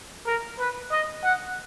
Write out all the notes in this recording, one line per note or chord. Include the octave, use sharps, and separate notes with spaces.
A#4
B4
D#5
F#5